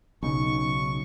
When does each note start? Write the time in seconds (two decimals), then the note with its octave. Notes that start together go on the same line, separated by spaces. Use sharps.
0.23 B1 C#3 D#4 C#6